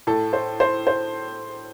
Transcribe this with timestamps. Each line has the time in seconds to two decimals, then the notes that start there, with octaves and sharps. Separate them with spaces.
0.07 A2 A4
0.33 C5
0.60 C5
0.87 C5